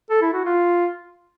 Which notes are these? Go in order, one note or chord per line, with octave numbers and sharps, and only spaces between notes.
A4
E4
F#4
F4